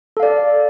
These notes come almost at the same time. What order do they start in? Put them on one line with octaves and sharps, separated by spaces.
A4 F5 D5